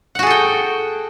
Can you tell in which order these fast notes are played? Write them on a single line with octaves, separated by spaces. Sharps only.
F#5 F#4 G#4 A4 G5